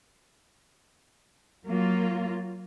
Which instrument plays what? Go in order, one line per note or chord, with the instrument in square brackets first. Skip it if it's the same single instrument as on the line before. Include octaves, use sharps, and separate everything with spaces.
[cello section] F#3 A#3 F4